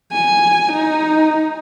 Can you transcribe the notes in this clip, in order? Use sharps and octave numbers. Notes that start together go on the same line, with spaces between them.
G#5
D#4